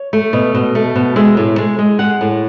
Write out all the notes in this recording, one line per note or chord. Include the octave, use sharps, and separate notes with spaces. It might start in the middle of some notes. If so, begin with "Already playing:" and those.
Already playing: C#5
A3
B2
B2
A3
B2
G#3 E5
A2
G#3
G#3
G#3 F#5
A2